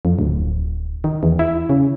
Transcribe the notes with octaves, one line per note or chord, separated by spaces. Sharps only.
F2
D1
D#3
E2
E4
C#3